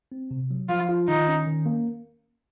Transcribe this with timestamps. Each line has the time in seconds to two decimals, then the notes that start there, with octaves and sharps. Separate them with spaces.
0.12 C4
0.31 C3
0.51 F#3
0.69 F3 F4
0.89 F4
1.08 D#3 D#4
1.28 C#4
1.47 D#3
1.66 A#3